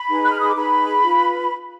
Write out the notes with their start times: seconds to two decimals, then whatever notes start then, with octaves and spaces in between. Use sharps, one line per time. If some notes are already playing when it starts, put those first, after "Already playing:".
Already playing: B5
0.08 D#4 G#4 B4
0.24 F#6
0.32 F6
0.40 D#6
0.48 D6
0.56 D#4 G#4 B4 B5
1.03 F4 B4